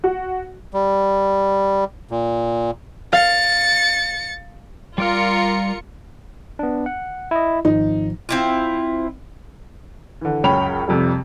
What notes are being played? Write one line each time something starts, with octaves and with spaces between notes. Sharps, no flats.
F#4
G3
A#2
F5 A6 C#7
G3 F4 A#4 D5 F6 C#7
B3 D4
F#5
E4 D#5
G#1 F3 D#4
C4 E4 F4
D3 E3
C#2 F#2 C#4 G5 B5 F7
F2 C3 F3 G3